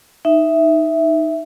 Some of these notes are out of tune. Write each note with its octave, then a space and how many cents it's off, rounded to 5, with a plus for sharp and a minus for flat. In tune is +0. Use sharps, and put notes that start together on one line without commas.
D#4 +0 E5 +0